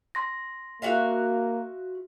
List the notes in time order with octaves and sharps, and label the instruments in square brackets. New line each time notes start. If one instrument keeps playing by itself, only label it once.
[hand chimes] C6 A#6
[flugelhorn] A#3 [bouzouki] F#4 E5 F5